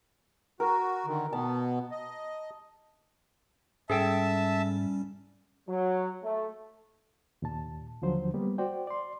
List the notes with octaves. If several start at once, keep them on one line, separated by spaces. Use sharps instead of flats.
F#4 A#4
D3 D#3
B2 B3 A5
D#5
G#2 G3 C#4 G#4 A4 E5 G5 A5
F#3
A3
D#2 A#2 A5
D#2 D3 F3 F#3 C5
G3 A#3 B3
F#4 C5 D5 G5
D5 C6